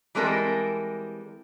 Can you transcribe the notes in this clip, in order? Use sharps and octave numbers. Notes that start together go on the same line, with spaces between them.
E3 G3 G#3 C4 A4 A#4